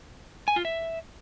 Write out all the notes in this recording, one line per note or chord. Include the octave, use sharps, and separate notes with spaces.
G#5
F4
E5